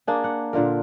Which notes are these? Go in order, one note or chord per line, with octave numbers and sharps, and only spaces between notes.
A#3 D4 G#4
F#5
A#2 D3 F4 A#4